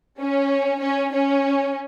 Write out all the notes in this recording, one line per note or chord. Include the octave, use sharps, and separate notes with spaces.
C#4
C#4
C#4